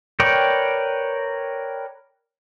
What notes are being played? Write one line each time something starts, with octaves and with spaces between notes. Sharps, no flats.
A#4 B4 C#5 D5 G5